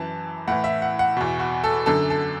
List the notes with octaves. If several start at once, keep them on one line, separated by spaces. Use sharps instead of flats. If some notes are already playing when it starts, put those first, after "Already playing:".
Already playing: F#2 E3 A5
A2 E3 F#5
E5
F#5
F#5
E2 B2
F#4
A4
F#2 D3 A4
A4